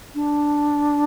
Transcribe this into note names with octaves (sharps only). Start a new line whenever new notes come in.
D4